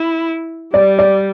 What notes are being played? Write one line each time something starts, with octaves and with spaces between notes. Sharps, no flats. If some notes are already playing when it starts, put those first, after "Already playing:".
Already playing: E4
G3 D5
D5